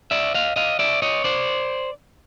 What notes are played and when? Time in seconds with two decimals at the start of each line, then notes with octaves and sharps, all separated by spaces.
0.11 D5 E5
0.34 D#5 F5
0.56 D#5 F5
0.79 D5 E5
1.02 C#5 D#5
1.24 C5 D5